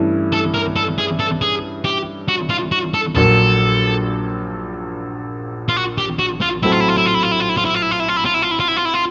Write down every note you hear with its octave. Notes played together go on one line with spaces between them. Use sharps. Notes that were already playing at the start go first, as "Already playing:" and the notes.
Already playing: G2 E3 A3 C#4 E4
A4
A#4
A4
G#4
A4
G#4
G4
F#4
F4
F#4
A4
A#1 A#2 F#3 A4
F4
F#4
G4
F#4
F4
A2 F#3 A3 C4 E4
F4
E4
F4
E4
F4
E4
F4
E4
F4
E4
F4
E4
F4
E4
F4
E4
F4
E4
F4
E4
F4
E4
F4
E4
F4
E4
F4